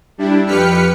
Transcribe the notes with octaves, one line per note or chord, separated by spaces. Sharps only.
G3 D4 E4
F2 G4 B4 F6 B6 C#7